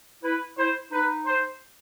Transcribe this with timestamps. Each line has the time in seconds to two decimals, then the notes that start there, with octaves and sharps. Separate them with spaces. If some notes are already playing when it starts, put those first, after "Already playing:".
0.23 E4 B4
0.57 E4 C5
0.91 D#4 B4
1.26 C5